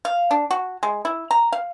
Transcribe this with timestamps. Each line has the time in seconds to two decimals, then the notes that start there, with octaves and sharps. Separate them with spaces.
0.05 F5
0.31 D4
0.51 F#4
0.83 G#3
1.05 E4
1.31 A#5
1.52 F5